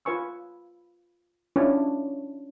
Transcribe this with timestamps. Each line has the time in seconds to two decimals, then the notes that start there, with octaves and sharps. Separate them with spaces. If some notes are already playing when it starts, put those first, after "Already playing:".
0.05 F4 B4 G#5 C#6 E6
1.56 C#4 D4 E4 F4 B4 C#5